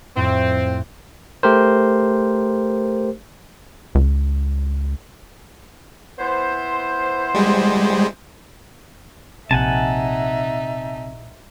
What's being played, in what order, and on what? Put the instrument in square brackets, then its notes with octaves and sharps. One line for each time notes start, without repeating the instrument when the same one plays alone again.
[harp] F2 A2 [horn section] C4
[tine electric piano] A3 G4 A#4 C5
[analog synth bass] C#2
[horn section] B3 E4 C5
[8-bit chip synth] G3 G#3
[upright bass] A#1 [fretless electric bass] C3 [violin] D#4 E5 [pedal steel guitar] F#5 G#5 A5